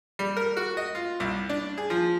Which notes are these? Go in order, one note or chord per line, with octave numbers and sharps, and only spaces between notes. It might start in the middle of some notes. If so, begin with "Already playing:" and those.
G3
A#4
F#4
D#5
F4
C2
D4
G#4
F3